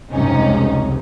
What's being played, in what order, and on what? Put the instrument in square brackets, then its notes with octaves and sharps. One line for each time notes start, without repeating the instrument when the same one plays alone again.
[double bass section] F1 C#2 G2 [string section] C3 C#4 D#4